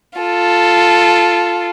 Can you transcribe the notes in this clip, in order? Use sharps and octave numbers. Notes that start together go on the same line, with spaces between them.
F4 A4